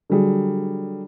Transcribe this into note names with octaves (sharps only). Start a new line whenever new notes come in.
D3 F#3 G3 G#4